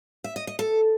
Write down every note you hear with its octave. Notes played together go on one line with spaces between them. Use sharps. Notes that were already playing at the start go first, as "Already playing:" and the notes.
E5
D#5
D#5
A4